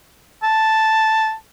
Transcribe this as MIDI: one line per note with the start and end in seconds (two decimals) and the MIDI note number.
0.43 1.33 81